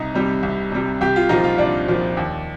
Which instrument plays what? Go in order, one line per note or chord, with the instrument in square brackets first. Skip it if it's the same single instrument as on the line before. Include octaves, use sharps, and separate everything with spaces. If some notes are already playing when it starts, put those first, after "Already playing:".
Already playing: [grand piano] C2 D#4
C3 G3
C2
C3 G3
C2 G4
F4
A#2 F3 D#4
F4
C2 D4
A#2 F3
D#2